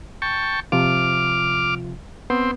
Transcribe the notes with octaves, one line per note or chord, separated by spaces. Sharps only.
G5 A5 C#6
C3 F3 F4 D6 F6
B3 C4